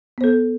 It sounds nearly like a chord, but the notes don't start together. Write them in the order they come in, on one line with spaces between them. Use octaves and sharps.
B3 C5 A4